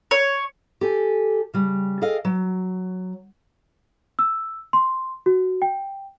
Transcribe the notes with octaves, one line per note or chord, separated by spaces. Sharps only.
C#5
G4 A4 G#5
C#3 G3
G#4 A4 D#5 F5 G5
F#3
E6
C6
F#4
G5